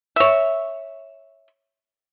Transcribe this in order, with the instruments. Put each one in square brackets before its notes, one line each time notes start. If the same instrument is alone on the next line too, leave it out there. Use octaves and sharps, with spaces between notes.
[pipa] C#5 E5